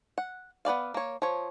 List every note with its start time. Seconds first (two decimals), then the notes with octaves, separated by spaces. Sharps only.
0.18 F#5
0.65 B3 B4 D5 F5
0.94 A#3 C#5
1.22 F3 C#5